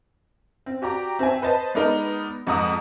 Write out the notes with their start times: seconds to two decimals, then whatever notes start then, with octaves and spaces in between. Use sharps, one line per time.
0.66 C4
0.82 F#4 G4 D5 A#5
1.19 C4 C5 E5 G#5
1.42 B4 C5 D#5 A5
1.75 G#3 B3 D4 D#4 A#4
2.47 F2 G#2 F#5 A#5 D#6